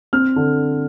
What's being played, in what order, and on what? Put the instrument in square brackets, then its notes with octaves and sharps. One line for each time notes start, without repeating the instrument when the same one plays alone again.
[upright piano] C4 F6
D3